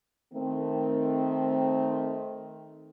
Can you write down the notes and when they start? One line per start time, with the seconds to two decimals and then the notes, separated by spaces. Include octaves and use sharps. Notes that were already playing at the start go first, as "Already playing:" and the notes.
0.33 D#3 A3 C4